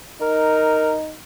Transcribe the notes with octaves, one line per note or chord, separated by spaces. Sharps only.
D#4 A#4